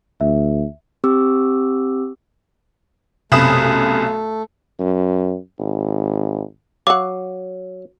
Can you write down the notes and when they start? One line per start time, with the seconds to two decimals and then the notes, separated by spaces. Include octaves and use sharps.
0.21 D2 E5
1.04 C4 G4 D6 E6
3.32 B1 F#2 C3 A3 B5 D#6 E7
4.79 F#2
5.59 G#1
6.87 F#3 F5 F#5 D6